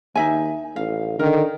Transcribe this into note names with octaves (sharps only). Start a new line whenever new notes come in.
D#2 D#4 E5 G#5
A1 F5
D3 D#3 A#4